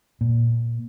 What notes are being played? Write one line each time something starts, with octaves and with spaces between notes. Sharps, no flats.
A#2